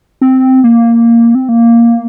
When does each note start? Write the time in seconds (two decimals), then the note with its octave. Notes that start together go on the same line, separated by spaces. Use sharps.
0.21 C4
0.64 A#3
1.35 C4
1.49 A#3